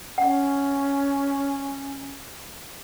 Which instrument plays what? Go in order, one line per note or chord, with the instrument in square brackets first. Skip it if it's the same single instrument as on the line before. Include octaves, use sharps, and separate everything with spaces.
[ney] C#4 [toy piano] F#5